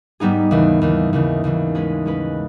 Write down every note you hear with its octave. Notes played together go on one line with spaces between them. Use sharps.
G#2 G3 B3 D#4 G#4
D#2 C#3 E3
D#2 C#3 E3
D#2 C#3 E3
D#2 C#3 E3
G#3 C#4 G#4 B4
G#3 C#4 G#4 B4